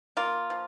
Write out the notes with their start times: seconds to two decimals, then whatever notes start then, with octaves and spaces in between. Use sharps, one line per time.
0.17 A#3 F4
0.50 F3